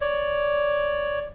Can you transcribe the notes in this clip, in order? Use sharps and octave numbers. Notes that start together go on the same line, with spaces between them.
C#5 D5